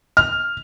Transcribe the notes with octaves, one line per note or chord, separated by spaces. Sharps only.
F6